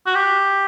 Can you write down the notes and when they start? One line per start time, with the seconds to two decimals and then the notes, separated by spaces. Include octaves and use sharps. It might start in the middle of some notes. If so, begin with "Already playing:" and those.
0.07 F#4
0.15 G4